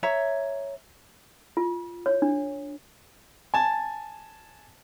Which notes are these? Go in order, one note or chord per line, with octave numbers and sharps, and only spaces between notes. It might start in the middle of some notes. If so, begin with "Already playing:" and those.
C#5 E5 A#5
F4
C#5
D4
G#5 A5